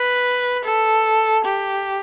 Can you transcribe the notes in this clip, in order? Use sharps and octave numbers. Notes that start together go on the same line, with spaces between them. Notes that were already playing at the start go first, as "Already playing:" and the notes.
Already playing: B4
A4
G4